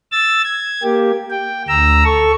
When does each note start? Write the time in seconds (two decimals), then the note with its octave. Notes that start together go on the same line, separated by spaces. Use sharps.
0.12 E6 A6
0.44 G#6
0.83 A#3 G4
1.30 G5
1.68 D2 A#5 E6
2.04 A4 C#6